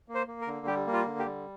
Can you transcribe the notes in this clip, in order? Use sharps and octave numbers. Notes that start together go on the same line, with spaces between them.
A#3
C5
A#3
A#4
D3
G3 G4
A#3
F4
D3
G4
G3